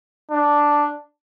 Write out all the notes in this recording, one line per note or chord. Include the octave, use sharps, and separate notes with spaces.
D4